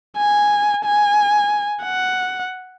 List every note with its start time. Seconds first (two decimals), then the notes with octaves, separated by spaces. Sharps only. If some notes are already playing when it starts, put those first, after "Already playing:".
0.17 G#5
0.85 G#5
1.83 F#5